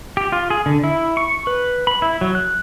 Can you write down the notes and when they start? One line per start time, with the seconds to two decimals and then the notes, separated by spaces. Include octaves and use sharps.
0.17 G4
0.32 F4
0.50 G#4
0.66 D3
0.84 E4
1.17 C#6
1.47 B4
1.87 B5
2.02 E4
2.21 F#3
2.35 F#6